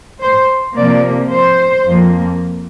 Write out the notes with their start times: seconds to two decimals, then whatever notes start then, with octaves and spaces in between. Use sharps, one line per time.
0.22 C5
0.76 C3 F3 A#3 D5
1.31 C5
1.86 F2 F3 A#3